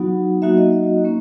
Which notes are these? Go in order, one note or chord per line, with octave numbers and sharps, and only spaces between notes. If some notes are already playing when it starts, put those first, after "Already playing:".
Already playing: F#3 B3 D#4 F#4
F#3 A#3 D#4 F#4 E5
D#5
D#5
A#3 C#4